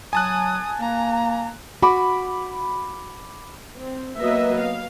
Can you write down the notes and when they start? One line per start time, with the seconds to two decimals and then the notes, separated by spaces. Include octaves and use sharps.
0.13 F#3 G#5 A5 D#6 F#6
0.80 A#3 A#5
1.82 F#4 B5 D6
3.77 C4
4.18 F#3 A#3 B3 B4 D#5 E5
4.59 F5